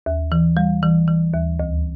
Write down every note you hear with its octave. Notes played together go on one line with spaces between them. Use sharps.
D#2
E3
G3
E3
E3
D#2
D2